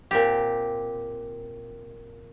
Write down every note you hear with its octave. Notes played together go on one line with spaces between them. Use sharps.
A#2 C4 G4